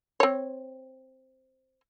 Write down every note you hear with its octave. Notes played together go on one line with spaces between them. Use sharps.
C4 C#5